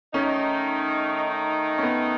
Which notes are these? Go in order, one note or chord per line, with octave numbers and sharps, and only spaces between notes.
D#3 A3 C#4 D#4
C#4
B3